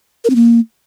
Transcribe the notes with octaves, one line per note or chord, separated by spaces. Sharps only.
A#4
C4
A#3